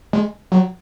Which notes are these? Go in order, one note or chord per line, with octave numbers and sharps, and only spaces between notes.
G#3
F#3